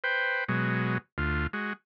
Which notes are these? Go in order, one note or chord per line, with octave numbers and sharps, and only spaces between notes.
B4 C5 G5
B2 F#3 G#3
D2 F4
G#3 F#4